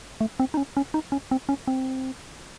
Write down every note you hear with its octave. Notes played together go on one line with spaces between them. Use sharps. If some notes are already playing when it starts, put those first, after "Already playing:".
A3
C4
D#4
C#4
C#4
D#4
C#4
C4
C#4
C4